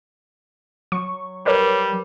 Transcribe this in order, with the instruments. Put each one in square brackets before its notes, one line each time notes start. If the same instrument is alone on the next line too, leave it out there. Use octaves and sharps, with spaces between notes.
[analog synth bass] F#3 [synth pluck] C#6
[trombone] G3 [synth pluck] A#4 B4 C#5